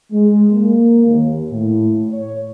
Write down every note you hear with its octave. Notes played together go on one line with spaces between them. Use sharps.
G#3
A#3
D#2
A2
C#5